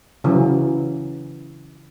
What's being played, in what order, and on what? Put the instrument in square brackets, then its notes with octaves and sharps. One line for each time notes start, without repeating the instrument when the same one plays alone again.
[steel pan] C#3 E3 F#3